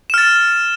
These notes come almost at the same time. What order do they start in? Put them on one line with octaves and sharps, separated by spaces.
E7 F6 A6